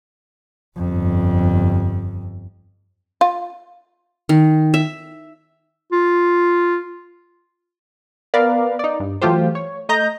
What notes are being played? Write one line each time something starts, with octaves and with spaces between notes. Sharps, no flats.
G1 F2
F4
D#3
E5
F4
B3 A#4 B4 D5 F5
D#4 D5
G2
E3 F#3 A3 F4 G4 C5
C#5
A3 D#5 A#5 G6 A#6